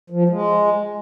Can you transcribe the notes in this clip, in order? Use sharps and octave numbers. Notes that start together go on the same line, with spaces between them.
F3
G#3